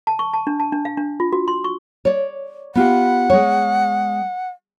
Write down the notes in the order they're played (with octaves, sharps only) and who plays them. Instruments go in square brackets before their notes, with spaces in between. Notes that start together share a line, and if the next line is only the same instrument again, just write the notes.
[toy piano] A5
C#6
A5
D4
A5
D4
F5
D4
F4
F#4
C6
C#6
[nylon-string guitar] C#5 D5
[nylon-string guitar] B3 F4 G4 [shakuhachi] F#5
[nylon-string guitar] G#3 C#5